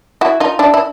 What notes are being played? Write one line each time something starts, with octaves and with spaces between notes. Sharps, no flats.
E4 F#4
D#4 F4
D4 E4
E4